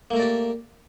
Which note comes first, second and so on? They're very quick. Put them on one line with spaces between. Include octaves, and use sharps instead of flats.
A#3 A3 A#4 D5 G4